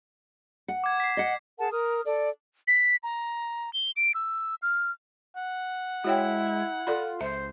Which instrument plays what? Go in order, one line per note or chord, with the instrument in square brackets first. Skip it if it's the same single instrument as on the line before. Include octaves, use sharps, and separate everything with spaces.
[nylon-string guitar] F#5
[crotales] D6 G#6
B6 C7
[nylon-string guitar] D#5 F#5
[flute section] G#4 A#4 F#5 A5
A#4 D#6 F6
A4 D5
[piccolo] B6
A#5
G7
D7
E6
F6
[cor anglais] F#5
[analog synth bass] G#3 [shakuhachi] E4 [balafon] F#4 C#5 G5
[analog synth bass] F4 [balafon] A4 D5 B5
[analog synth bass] C#2 [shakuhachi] C5 [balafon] E5